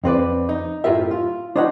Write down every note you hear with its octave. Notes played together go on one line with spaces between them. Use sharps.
F2 C4 B4 D5
D#4
F#2 A2 F4 G4 A#4 E5
F4
D4 D#4 C5 C#5 D#5 F#5